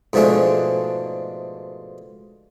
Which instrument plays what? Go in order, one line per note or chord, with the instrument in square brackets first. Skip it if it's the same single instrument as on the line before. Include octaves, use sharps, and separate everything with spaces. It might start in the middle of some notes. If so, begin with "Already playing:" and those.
[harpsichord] G#2 B2 F3 A3 D4 G#4